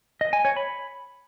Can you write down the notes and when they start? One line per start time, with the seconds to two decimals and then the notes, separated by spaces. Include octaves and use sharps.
0.21 D#5
0.33 G#5
0.45 C#5
0.57 B5